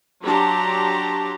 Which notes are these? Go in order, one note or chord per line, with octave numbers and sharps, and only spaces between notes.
F#3 D4 G4 A5 A#5 C6